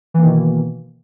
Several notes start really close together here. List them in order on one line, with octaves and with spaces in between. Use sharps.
E3 A#3 D#3 B2